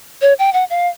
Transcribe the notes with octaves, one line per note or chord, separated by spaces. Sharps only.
C#5
G5
F#5
F5